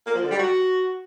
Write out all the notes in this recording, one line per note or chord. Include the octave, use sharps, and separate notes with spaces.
A#3
F3
D3
G3
F#4